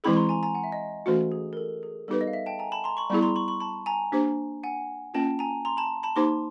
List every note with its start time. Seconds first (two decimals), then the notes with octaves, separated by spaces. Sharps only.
0.04 E3 G#3 C4 E4 G#4 B5 C#6
0.16 A#5 C6
0.29 G#5 A#5
0.43 G#5 A#5
0.55 F#5 G#5
0.64 E5
0.72 D#5
1.06 E3 A3 C#4 F#4 A4
1.32 G#4
1.53 A#4
1.57 A4
1.83 G#4
2.08 G3 B3 D#4 G4 A4 B4
2.21 D#5
2.27 F5
2.33 E5
2.46 G5 A5
2.59 G#5 A#5
2.72 A5 B5
2.84 A#5 C6
2.97 B5 C#6
3.10 G3 B3 E4 G#4 B5 C#6
3.22 A#5 C6
3.36 B5 C#6
3.48 B5 C#6
3.61 A5 B5
3.86 G#5 A#5
4.12 A#3 D4 G4 C5
4.63 F#5 G#5
5.14 A#3 C#4 F4 G5 A5
5.39 G#5 A#5
5.65 A#5 C6
5.77 A5 B5
6.03 A5 B5
6.16 A#3 D#4 G4 C5 C6 D6